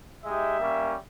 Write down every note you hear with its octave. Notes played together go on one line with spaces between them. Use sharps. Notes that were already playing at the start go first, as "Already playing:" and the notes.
G#3 D#4 G4 E5
G3 A#3 C#4